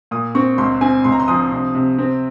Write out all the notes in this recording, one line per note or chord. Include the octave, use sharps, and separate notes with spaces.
A#2 D#6
C4 C#6
C#2 C6
C4 G#5
C#2 C6
A#5
C6
F3 D#6
C3
C3
C4